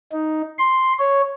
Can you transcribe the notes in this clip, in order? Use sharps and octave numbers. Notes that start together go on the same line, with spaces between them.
D#4
C6
C#5